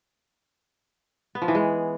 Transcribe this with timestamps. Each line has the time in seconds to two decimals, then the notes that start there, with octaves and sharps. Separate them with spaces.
1.35 B3
1.42 F3
1.48 E3
1.55 G#3